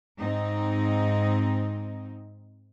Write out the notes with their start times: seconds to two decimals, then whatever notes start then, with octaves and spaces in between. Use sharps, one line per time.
0.18 G#2 C4 D#4